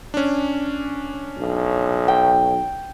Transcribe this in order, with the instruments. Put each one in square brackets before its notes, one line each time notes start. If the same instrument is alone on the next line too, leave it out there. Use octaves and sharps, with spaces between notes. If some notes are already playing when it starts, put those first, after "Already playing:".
[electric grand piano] C#4 D4
[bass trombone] B1
[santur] G5